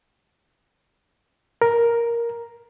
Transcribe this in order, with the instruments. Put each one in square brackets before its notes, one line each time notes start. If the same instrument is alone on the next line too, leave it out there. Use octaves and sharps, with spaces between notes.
[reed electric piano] A#4